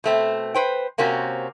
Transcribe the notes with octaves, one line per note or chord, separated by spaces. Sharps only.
B2 A3 C4
B4 C5 G5
C3 A#3 C4 C#4 F#4